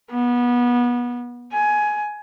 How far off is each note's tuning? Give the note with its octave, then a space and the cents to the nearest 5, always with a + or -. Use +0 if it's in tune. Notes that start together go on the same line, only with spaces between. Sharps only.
B3 -25
G#5 +15